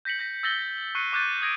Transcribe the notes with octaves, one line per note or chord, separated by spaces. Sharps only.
G6 A#6 B6 C#7 F#7
G6 A#6 B6
E6 G6 A6 A#6 F#7 G7
C#6 F#6 C7 C#7 D#7
C#6 D6 F#6 G6 A6 D#7
D#6 G#6 A#6 D7 D#7